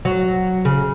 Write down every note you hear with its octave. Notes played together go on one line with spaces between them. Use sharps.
F#3
C#3